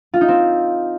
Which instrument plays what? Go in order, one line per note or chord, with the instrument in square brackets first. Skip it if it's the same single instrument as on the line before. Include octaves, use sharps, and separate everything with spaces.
[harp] F4
D#4
C4